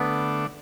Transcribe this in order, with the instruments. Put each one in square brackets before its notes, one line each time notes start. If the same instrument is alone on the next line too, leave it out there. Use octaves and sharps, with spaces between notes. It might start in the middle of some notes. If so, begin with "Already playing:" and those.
Already playing: [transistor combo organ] D3 A3 D4 [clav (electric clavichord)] B3